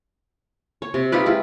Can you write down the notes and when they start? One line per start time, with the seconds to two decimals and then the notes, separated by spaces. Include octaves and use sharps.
0.82 C#5
0.94 C3
1.12 D#4 F4 G4 B4
1.26 G#3 E4 F4